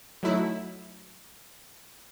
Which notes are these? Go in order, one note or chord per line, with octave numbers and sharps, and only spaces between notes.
F#3 A3 D#4 E4 E5